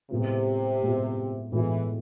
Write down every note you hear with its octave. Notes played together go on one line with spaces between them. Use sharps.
A2 C3 G#3 B3 F4
A2 G#3 B3 F4
A2 E3 G#3 B3 F4